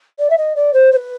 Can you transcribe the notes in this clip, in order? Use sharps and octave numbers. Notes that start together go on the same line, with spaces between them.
D5
E5
D#5
D5
C5
C5
B4